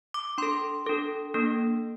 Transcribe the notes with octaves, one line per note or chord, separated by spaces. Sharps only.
D6
D4 A4 C6
D4 A4
A#3 D4 A4